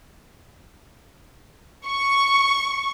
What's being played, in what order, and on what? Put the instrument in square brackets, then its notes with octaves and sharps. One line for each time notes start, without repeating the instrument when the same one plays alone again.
[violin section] C#6